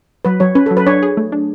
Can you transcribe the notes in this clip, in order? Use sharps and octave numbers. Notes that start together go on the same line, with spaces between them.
F#3 B4
F#3 C#5
C#4 B4
A4
F#3
B4
D4 C#5
G#4
A3
D4